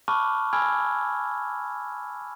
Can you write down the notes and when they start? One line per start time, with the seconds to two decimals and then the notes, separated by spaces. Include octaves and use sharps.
0.08 A5 B5 C#6 D6 F6 F#6
0.53 G#5 B5 E6 F6 G#6